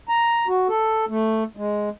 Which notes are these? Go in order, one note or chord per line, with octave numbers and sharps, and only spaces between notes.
A#5
F#4
A4
A3
G#3